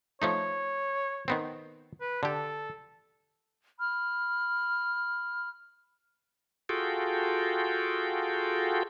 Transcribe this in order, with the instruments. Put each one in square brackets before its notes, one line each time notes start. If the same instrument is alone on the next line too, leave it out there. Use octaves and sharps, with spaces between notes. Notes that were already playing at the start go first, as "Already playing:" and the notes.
[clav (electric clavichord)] F3 A3 D#4 [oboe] C#5
[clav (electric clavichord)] D#3 B3 C4
[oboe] B4
[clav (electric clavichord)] D3 G4 [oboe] A4
[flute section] B5 F6
[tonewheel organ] F4 F#4 G#4 A4 G5